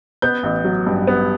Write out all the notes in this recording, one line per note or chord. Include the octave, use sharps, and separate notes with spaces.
B3 G6
A1
F#3
G2
B3